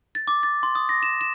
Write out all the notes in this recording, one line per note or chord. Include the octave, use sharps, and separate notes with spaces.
A6
D6
A6
C6
D#6
A#6
E7
E7